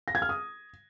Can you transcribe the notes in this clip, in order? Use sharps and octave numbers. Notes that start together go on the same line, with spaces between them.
A#6
G#6
F6
D#6